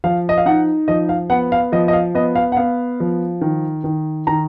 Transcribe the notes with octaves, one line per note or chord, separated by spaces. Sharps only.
F3 F5
D#5
F5
D#4 F#5
F3 D#5
F5
B3 F#5
F5
F3 D#5
D#5
F5
B3 D#5
F5
F#5
B3 F5
F3
D#3
D#3
D#3 A#5